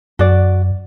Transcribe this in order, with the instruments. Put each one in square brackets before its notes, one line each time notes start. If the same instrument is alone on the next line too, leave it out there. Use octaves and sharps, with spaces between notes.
[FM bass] F#2 [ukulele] F#4 D5